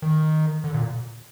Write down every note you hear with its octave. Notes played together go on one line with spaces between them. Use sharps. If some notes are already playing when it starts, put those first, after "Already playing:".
D#3
D3
A#2